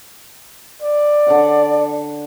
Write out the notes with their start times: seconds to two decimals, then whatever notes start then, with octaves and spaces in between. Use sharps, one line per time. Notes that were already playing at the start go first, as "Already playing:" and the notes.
0.82 D5
1.27 D3 C#5 F#5